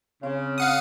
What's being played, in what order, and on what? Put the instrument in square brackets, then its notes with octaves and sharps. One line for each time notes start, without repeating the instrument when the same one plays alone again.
[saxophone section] C#3 [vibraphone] C4 C#5
[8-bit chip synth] F5 F#5 D#6